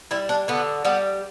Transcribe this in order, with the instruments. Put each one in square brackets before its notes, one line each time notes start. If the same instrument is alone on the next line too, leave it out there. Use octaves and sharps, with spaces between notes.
[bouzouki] G3 E4
D4
D3 B3
G3 B3